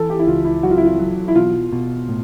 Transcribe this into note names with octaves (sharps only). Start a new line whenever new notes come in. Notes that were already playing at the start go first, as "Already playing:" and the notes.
Already playing: E3 A4
G4
E4
C#2 F4
E4
F#3 F#4
F4
E4
F4
F#3
E4
B2 F4
B2
A2